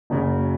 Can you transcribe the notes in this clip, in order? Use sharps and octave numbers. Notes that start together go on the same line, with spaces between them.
F#1 F#2 C#3 F#3